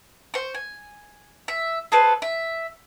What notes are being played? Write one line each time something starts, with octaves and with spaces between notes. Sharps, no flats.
C5 C#6
G#5
E5
G#4 A4 B4 C5
E5